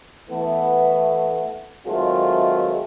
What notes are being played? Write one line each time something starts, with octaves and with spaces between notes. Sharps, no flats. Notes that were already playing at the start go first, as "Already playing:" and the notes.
E3 A3 B3
D#3 F#3 G#3 A3 C4 F4